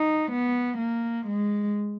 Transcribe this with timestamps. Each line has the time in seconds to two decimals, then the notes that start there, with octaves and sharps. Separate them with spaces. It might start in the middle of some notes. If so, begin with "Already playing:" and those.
Already playing: D#4
0.31 B3
0.78 A#3
1.26 G#3